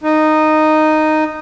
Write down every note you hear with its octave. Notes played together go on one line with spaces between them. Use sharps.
D#4